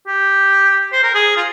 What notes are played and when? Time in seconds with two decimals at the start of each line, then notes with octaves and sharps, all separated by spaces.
0.07 G4
0.92 C5
1.04 A#4
1.15 G#4
1.37 F4